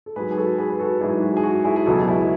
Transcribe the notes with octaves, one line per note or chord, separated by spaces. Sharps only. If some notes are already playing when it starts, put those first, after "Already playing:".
A4
G#2 F#3 G#4 B4
G#4
F#4 A4
G#4 B4
B4
F#4 A4
G#2 F#3 E4 G#4
F#4
G#4
F#4
E4 G#4
G#4
C#2 B2 F#3 F#4 A4
E4 G#4